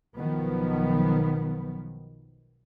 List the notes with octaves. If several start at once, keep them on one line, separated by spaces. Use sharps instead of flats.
B1 D#3 F3 F#3 B3